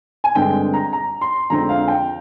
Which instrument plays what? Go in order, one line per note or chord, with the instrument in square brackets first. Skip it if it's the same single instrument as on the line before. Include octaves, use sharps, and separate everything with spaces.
[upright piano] G#5
G2 D3 G#3 C4 G5
A#5
A#5
C6
F2 D3 G#3 C4 A#5
F5
G5